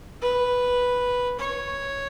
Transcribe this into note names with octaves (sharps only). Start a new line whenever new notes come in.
B4
C#5